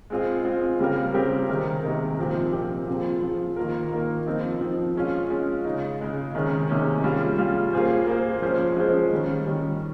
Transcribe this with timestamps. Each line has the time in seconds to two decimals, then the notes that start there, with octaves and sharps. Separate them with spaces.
0.10 G#3 C4 F4 G#4
0.45 G#3 C4 F4 G#4
0.79 C#3 G3 C4 G4 A#4
1.14 C#3 G3 C4 G4 A#4
1.48 C3 D#3 G#3 D#4 A#4
1.84 C3 D#3 G#3 D#4 A#4
2.18 A#2 F3 C4 G4 A#4
2.53 A#2 F3 C4 G4 A#4
2.88 F3 C4 F4 G#4
3.22 F3 C4 F4 G#4
3.56 D#3 A#3 F4 A#4
3.92 D#3 A#3 F4 A#4
4.26 F3 C4 D#4
4.61 F3 C4 D#4
4.95 G#3 C#4 F4
5.30 G#3 C#4 F4
5.65 C#3 G#3 D#4
5.99 C#3 G#3 D#4
6.34 C3 D#3 G#3 C#4
6.69 C3 D#3 G#3 C#4
7.04 G3 C#4 F4 G#4
7.38 G3 C#4 F4 G#4
7.73 A#3 F4 G#4 C5
8.07 A#3 F4 G#4 C5
8.42 F3 G#3 C#4 G#4 C5
8.77 F3 G#3 C#4 G#4 C5
9.11 D#3 G3 C#4
9.46 D#3 G3 C#4